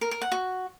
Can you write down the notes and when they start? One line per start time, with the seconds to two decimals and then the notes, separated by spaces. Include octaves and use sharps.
0.01 A#4
0.11 A#4
0.22 F#5
0.32 F#4